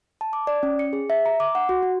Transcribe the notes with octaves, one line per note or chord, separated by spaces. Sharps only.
A5
D6
D5
C#4
C#7
G#4
E5
A#5
D6
F#5
F#4
F#4